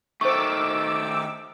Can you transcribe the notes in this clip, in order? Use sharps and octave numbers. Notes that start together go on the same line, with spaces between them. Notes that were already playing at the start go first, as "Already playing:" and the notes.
D#3 A3 C5 C#6 D6 E6